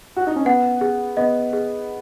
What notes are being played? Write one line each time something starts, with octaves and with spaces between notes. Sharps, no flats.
F#4
D#4
C#4
B3 F#5
G#4
B3 D#5
G#4